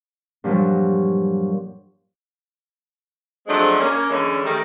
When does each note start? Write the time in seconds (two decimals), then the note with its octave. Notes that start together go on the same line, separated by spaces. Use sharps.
0.44 G2 A#2 F3 F#3
3.47 F3 F#3 G#3 A3 C4 D4
3.79 A#3 C#4
4.09 D3 E3 G#3 C#4
4.44 D#3 G3 A3